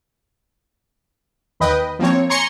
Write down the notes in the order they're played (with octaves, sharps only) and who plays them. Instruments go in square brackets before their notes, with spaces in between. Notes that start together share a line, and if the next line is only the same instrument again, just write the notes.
[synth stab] D#2 B4 D#5 G5
F3 A#3 C4 C#5
G#5 A#5 C6 C#6 C#7